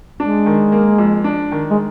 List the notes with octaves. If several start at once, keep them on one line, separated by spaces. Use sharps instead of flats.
G#3 D4
D#3
A#3
F2
D4
D#3
G#3